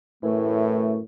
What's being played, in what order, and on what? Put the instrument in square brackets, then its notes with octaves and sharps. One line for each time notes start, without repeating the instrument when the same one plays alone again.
[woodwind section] F#2 E3 A3 [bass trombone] A2